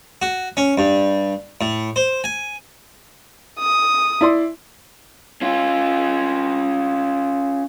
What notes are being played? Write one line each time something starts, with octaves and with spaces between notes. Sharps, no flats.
F#4
C#4
G2
A2
C5
G#5
D#6
E4 D5 C6
C#4 F4